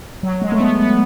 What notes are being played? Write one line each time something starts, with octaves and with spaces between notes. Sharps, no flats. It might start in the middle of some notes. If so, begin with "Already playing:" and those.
F#3
G#3
A3
B3
B3